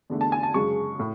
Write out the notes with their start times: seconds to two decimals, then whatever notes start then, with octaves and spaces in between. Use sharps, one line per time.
0.10 E2 D3 A3
0.21 A5
0.32 G#5
0.43 A5
0.54 F#2 C#3 G#3 C#6
0.99 A2